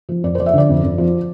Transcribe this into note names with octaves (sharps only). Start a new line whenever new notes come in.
F3
F2 D5
F3 C5 D5
E5
D3 D5
F2
F2
F3